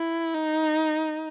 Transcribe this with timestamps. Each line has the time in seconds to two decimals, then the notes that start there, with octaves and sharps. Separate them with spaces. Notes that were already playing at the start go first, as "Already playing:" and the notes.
Already playing: E4
0.34 D#4